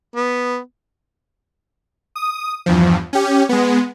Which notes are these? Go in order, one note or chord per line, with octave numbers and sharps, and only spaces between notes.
B3
D#6
E2 G2 F3
C#4 G4
G#3 B3